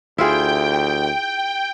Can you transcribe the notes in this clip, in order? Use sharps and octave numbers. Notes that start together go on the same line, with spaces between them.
D2 E4 F4 G#4 G5